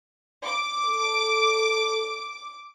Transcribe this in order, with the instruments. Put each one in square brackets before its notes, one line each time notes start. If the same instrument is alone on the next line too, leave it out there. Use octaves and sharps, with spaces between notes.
[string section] D6
[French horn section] A4